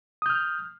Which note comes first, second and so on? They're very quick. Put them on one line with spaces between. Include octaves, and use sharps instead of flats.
D#6 G6 F6